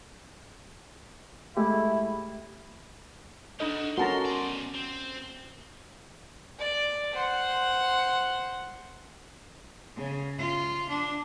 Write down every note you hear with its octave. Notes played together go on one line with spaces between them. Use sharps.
G#3 A3 E4 G4
D4 D#4 F#4 G4 A4 D#5
G3 C#4 F#4 A4 A#4 A5 A#5 C6
B2 D5 C6
C4
D5 D6
C5 F#5
C#3
F4
D4